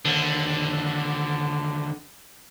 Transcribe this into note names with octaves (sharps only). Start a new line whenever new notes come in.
D#2 D3